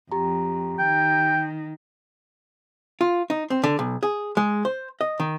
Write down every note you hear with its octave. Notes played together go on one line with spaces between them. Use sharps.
F2 G4 A#5
D#3 G5
F4
D#4
C4
D3
B1
G#4
G#3
C5
D#5
D#3